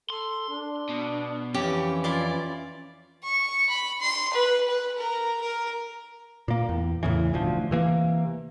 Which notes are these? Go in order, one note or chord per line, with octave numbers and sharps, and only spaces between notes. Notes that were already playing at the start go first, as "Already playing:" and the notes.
A4 C6
D4
B2
F2 E3 C#4 G4
E4 F4 D5
C#6
B5
C6
B4
B4
A#4
A#4
A#2 A#3
E2
E2 A2 C#3 E3
E1 D2 F3
C3 E3 A#3